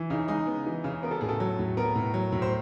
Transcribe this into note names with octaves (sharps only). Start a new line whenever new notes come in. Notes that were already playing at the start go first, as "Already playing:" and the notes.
Already playing: E3
C#3 D#4
G#3 D#4
B3
E3
C#3
B3 A#4
A4
A2 G#4
A4
F#3
A2
B3 A#4
A2
F#3
A2
C5